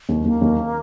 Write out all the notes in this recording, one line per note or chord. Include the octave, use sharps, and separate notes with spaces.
D#2
D#2 A#3
D#2